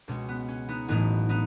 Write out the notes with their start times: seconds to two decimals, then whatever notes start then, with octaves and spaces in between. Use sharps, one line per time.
0.08 C#2 B2 G#3 C#4
0.28 B3
0.48 C#4
0.69 B3 D#4
0.88 A1 A2 F#3 B3 D#4
1.29 B3 D#4